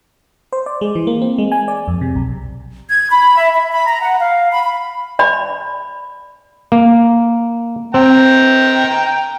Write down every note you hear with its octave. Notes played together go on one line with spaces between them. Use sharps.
C5
D5
G#3
E3
A#3
C4
G#3
G#5
D5
F2
C3
B1
G#6
B5
E5
E5
B5
A#5
F#5
F5
B5
B5
D5 B5
A#3
C4 G5 A#5